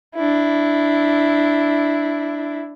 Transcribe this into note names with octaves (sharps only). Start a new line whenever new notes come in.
D4 E4